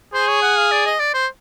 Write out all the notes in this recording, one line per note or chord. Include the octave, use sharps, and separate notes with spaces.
G#4 C5
C#5
F#5
F5
D5
D#5
D5
C5